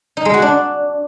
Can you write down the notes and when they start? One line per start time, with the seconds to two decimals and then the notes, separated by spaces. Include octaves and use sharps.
0.17 D#4
0.25 G#3
0.34 F#4
0.42 D4